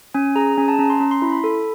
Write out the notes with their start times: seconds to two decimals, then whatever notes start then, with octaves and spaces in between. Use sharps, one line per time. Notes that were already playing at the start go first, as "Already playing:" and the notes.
0.14 C#4 G#5
0.36 G#4 A#5
0.58 C#4 G#5
0.68 A5
0.79 C#4 A#5
0.90 C6
1.00 C#4 A#5
1.11 C6
1.22 E4 B5
1.32 B5
1.44 A4